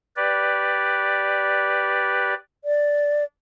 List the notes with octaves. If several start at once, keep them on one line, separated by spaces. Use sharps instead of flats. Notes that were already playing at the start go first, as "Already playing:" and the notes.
G4 B4 D5
D5